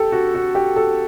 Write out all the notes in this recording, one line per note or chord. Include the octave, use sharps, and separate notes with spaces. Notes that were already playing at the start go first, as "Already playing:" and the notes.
Already playing: G4 A4
F#4
F#4
G4
A4